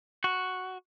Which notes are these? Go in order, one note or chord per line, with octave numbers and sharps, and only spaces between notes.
F#4